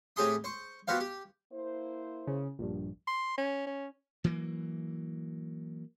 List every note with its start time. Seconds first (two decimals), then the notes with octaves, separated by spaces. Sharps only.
0.16 A2 C4 G4 G#4 C6 D#6
0.44 C5 C#6
0.88 B3 F#4 G4 C5 F5
1.00 G4
1.53 A#3 E4 C5
2.27 C#3
2.59 A#1 G2
3.07 C6
3.38 C#4
3.67 C#4
4.24 E3 F#3 A#3